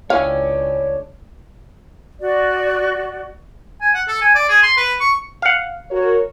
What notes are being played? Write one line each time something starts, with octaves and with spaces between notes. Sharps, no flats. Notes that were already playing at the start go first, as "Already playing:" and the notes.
C#2 D4 E4 C#5 F5 G5 G#5
F#4 D5
G#5
F#5
A4
G#5
D5
G#4
C6
B4
C#6
F5 F#5
F#4 A#4 C#5